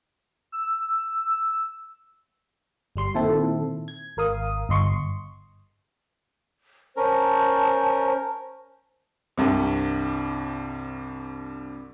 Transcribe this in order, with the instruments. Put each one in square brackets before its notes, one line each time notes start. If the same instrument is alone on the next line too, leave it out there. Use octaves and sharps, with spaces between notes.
[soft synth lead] E6
[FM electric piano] G1 G3 C6 C7
A#2 D#3 C4 E4 A4
G#6
G#1 A#4 F5 D#6
G1 D#5 C6 C#6
[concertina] C#4 A#4 [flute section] C5 A5
[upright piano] C2 G2 C3